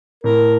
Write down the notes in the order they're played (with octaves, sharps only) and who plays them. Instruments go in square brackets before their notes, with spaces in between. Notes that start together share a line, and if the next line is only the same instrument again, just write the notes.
[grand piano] A2 [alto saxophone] A#4